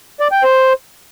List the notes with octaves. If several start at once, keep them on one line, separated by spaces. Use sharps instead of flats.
D5
G5
C5